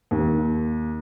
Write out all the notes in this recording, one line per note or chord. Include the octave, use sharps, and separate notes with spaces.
D#2